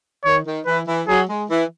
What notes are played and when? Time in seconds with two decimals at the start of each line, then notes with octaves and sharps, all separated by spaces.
0.25 D#3 C#5
0.46 D#3
0.66 E3 B4
0.87 E3
1.08 F#3 G#4
1.29 G#3
1.49 E3